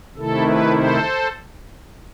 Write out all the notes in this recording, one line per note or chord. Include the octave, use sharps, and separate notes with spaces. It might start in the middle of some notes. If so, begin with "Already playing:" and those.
C3 D#3 A3 E4 A4
B4
A4 C5